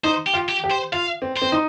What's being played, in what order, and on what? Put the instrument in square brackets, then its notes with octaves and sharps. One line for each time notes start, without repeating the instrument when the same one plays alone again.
[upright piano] D#4 [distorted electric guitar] C5
[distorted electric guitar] G4
[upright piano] F4
[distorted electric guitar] G4
[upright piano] G4
[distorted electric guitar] C5
[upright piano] F4 [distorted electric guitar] F5
[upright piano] C4
[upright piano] C4 [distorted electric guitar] C5
[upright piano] D#4